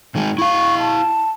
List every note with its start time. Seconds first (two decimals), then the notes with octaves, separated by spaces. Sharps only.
0.15 G#2 D#3 G#3
0.38 E4 F5 C#6
0.79 A5